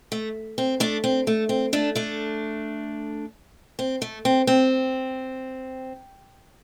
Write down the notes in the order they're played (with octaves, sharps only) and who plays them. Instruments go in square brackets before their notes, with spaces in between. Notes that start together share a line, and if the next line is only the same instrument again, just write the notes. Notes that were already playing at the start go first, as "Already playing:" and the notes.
[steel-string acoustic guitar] A3
C4
A3 D4
C4
A3
C4
A3 D4
A3 D4
C4
A3
C4
C4